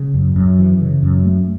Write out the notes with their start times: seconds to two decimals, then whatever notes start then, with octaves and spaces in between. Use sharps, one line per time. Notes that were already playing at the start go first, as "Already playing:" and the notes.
Already playing: C#3
0.14 F#2
0.36 F#2
0.59 E3
0.81 C#3
1.03 F#2
1.25 A3